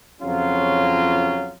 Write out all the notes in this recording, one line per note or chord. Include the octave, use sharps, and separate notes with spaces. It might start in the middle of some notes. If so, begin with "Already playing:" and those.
F2 C#3 F#3 C#4 F4